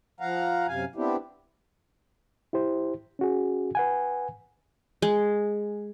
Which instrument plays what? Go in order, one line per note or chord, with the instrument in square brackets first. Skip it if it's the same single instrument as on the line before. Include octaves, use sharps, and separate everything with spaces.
[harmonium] F3 F5 F#5 A#5
F#2 C3 F5 G#5
B3 C4 D4 E4 G4
[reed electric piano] E4 G4 C5
C#4 F#4 G#4
B4 F#5 G#5
[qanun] G#3